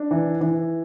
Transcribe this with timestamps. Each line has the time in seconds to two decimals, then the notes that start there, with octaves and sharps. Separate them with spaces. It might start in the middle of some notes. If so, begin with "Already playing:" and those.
Already playing: D4
0.11 E3
0.41 E3